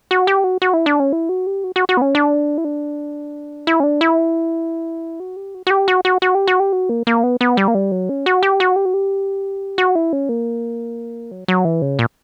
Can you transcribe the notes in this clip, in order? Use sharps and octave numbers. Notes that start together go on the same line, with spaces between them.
F#4
G4
F#4
F#4
E4
D4
C#4
E4
F#4
G4
F#4
F#4
F#4
B3
C#4
D4
E4
D4
E4
C#4
D4
E4
F#4
G4
F#4
F#4
G4
F#4
F#4
F#4
G4
F#4
G4
F#4
A#3
A#3
B3
B3
G3
A#3
G3
F#3
C#4
F#4
G4
F#4
G4
F#4
G4
F#4
E4
C#4
A#3
F#3
F#3
E3
C#3
A#2